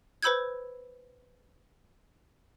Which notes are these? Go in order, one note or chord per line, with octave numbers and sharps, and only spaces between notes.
B4 C5 B5 E6 G6 G#6